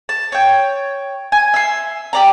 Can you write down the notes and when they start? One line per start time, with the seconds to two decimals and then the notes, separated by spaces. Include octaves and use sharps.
0.09 A5
0.32 C#5 G5
1.32 G#5
1.54 E5 C6
2.13 G4 D5 A#5